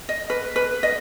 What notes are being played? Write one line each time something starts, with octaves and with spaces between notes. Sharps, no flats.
D#5
B4
B4
D#5